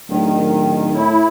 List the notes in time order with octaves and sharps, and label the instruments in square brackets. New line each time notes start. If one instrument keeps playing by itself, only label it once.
[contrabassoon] D1 [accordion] D#3
[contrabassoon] A2 [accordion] E4